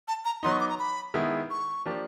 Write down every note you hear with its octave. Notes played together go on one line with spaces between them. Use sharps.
A5
A#5
F#3 B3 D#4 C6
C#6
D6
A#5
B5
D#3 G#3 B3 E4
C#6
F3 A#3 D4 G4